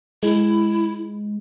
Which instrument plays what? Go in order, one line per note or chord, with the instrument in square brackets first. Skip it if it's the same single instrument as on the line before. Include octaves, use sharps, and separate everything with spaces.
[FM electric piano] G#3 [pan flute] E4